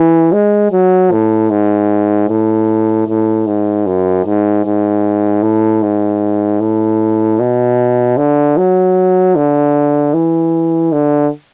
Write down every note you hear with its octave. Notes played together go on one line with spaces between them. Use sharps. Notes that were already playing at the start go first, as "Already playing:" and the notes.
Already playing: E3
G#3
F#3
A2
G#2
A2
A2
G#2
F#2
G#2
G#2
A2
G#2
A2
B2
D3
F#3
D3
E3
D3